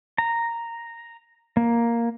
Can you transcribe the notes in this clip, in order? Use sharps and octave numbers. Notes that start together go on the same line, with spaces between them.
A#5
A#3